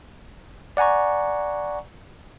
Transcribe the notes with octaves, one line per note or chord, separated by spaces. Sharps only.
D5 F#5 G#5 A#5 C#6